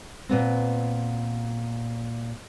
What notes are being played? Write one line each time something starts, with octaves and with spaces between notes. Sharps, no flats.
A#2 B3 C4